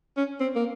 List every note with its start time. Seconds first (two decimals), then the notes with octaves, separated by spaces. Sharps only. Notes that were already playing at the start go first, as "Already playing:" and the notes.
0.17 C#4
0.40 C4
0.55 A#3